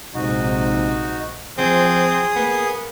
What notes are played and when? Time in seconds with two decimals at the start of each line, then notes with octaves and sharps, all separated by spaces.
0.14 A#1 G#2 C3 D#4 F#4
1.58 F3 C4 G#4 D#6
2.36 A#3 B3